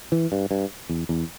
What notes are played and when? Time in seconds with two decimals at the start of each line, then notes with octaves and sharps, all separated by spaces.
0.12 E3
0.32 G2
0.51 G2
0.89 E2
1.09 E2